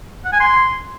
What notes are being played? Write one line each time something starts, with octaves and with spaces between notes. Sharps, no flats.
F#5
G#5
C6